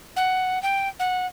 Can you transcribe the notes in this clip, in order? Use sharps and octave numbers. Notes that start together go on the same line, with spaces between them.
F#5
G5
F#5